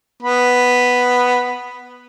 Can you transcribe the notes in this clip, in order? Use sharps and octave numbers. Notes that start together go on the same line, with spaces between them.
B3 B5